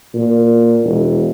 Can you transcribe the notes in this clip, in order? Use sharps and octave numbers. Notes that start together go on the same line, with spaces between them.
A#2
E1